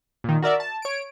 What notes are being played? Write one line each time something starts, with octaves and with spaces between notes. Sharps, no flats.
A#2 D#3
F#4 A#4 D5 E5
A5
C#5 D7